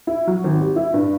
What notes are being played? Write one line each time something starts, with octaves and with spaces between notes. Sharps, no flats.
E4
F#3
G#1
G3
E4
G2